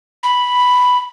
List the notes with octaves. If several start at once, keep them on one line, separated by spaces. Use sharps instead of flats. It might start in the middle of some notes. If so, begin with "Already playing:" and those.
B5